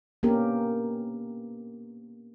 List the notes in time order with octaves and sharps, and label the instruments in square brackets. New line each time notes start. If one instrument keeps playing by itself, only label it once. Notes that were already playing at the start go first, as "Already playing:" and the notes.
[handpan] A#3 B3 C#4 D4 G4 A#4